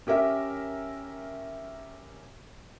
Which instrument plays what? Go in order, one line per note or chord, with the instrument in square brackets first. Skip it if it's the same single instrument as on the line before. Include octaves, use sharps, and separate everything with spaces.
[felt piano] C#4 G4 A#4 E5